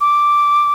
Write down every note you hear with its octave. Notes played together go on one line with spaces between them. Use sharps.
D6